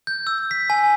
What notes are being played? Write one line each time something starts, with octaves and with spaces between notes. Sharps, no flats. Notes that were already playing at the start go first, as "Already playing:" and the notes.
G6
E6
B6
G#5